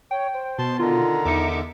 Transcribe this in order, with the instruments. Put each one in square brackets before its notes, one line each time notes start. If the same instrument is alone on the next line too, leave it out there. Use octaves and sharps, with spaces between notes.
[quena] C#5 [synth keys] G5
[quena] C5
[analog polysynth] B2 [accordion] A5 C6
[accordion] D3 D#3 [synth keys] F4 [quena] A#5
[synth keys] E2 C#7 [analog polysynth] D#4 E5 D6